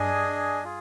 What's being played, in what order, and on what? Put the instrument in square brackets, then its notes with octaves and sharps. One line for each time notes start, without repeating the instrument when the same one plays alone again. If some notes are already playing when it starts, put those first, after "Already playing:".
Already playing: [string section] G2 [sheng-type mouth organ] D4 G#4 D#5 G#5
[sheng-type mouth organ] F4 G#4